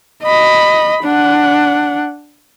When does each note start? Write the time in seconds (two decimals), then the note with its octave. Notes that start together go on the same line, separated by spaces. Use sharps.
0.23 D#5 B5
1.03 D4 F#5